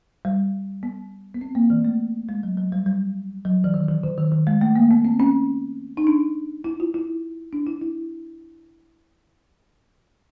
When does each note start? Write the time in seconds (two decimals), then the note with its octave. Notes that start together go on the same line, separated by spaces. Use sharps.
0.25 G3
0.83 B3
1.35 B3
1.41 C4
1.55 A#3
1.70 E3
1.85 A3
2.29 G#3
2.43 F#3
2.57 F#3
2.72 G3
2.86 G3
3.45 F#3
3.64 E3
3.74 D#3
3.89 E3
4.03 D3
4.18 D#3
4.32 D#3
4.47 G#3
4.61 A3
4.76 A#3
4.91 B3
5.05 C4
5.20 C#4
5.97 D#4
6.07 D4
6.64 E4
6.80 F4
6.94 E4
7.53 D4
7.67 E4
7.82 E4